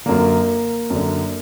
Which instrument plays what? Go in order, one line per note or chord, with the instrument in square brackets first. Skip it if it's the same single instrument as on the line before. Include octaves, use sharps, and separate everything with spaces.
[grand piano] F#2 D3 A#3
F#2 D3